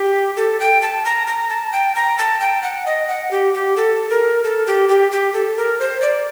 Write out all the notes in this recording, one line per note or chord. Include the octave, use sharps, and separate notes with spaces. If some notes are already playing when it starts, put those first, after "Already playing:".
Already playing: G4
A4
G5
A5
A#5
A#5
A5
G5
A#5
A5
G5
F#5
D#5
F#5
G4
G4
A4
A#4
A4
G4
G4
G4
A4
A#4
C5
D5